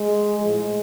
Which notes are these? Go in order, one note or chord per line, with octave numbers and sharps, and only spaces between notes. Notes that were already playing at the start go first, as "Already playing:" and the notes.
Already playing: G#3
A2 F3 G#3